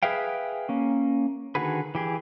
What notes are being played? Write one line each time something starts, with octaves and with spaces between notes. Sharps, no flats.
G#4 B4 E5 F5 G5
A#3 C#4
D3 D#3 F#4 G#4 B4
E3 G4 G#4